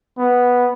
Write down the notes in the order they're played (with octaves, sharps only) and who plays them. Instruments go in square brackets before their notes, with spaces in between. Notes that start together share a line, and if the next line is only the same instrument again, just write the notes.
[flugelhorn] B3